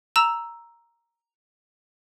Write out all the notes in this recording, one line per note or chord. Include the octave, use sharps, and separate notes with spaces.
A#5 E6 E7